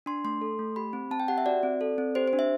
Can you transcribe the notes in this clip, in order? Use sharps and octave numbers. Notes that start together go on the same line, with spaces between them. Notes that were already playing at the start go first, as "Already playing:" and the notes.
D4 C6
A3 C6
A4
A3
G4 B5
C4
C4 A5
G5
G4 F#5
E5
F#4 D5
C4
A4
C4
G4 C5
C5
D4
E5